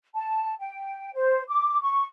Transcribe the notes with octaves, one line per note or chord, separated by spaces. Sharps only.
A5
G5
C5
D6
C#6